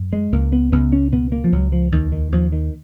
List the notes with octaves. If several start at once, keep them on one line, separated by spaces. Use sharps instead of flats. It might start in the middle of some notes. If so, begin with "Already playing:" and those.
Already playing: F#2
G#3
C#2 A#3
B3
C#2 B3
C#4
B2 B3
A#3
F3
C#2 F#3
F3
D#2 D#3
D#3
D#2 F3
D#3